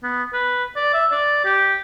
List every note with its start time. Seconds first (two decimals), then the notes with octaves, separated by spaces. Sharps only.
0.02 B3
0.33 B4
0.76 D5
0.93 E5
1.12 D5
1.45 G4